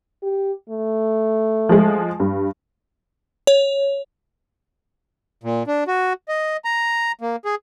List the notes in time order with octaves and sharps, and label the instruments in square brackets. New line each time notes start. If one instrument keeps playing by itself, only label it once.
[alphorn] G4
A3
[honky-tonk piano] F3 G#3
G2
[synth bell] C#5
[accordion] A#2
D4
F#4
D#5
A#5
A#3
G#4